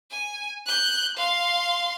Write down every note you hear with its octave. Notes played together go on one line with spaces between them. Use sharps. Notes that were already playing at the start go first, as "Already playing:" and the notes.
G#5
F#6 G6
F5 C6